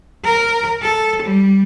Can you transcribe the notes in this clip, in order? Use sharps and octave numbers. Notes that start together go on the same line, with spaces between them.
A#4
A4
G3